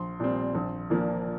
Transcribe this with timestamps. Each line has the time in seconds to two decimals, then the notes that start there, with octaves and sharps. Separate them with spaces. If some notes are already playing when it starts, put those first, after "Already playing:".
Already playing: A#1 C6
0.20 A#2 G3 C4
0.55 A#1
0.90 A#2 F3 A#3 D4